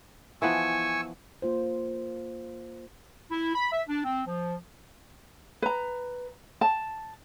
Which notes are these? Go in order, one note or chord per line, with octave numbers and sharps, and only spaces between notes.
E3 F3 B3 G#5 C#6 E6
A#3 F4 C5
E4
B5
E5
D4
C4
F3
B4 A#5
A5